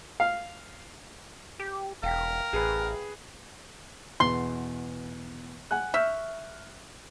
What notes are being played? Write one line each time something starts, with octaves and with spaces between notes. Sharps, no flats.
F5
G4
E1 A#4 F5 G5 B6
A1 G#4 B4
E2 B2 C6
F#5 G#5 F#6
E5 C#6 F6 G6